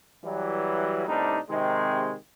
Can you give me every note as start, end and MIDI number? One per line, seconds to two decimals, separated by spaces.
0.24 1.07 52
0.24 1.07 54
0.24 1.07 55
1.08 1.39 39
1.08 1.39 45
1.08 1.39 48
1.08 1.39 55
1.08 1.39 62
1.08 1.39 63
1.50 2.15 48
1.50 2.15 51
1.50 2.15 56